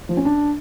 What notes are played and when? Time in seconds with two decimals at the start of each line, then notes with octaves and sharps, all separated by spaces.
0.09 F3
0.17 C#4
0.25 D4